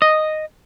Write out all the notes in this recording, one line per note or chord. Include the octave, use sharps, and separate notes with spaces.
D#5